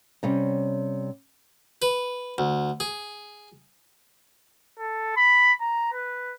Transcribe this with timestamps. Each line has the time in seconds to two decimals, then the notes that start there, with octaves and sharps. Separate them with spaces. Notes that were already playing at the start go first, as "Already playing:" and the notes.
0.23 C3 G3 C#4
1.82 B4
2.38 D2
2.80 G#4
4.79 A4
5.17 B5
5.61 A#5
5.93 B4